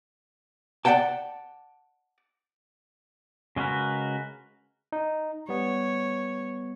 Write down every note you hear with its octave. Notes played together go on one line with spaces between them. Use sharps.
D5 E5 F#5 G5 A5
C#3 G#3 F#4 A#4 B4
D#4
G3 B3 C#5